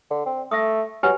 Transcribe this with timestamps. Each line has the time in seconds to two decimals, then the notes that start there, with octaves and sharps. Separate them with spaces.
0.11 D3
0.26 C4
0.51 A3 E5 D#6
1.03 F#3 G4 B4 G#5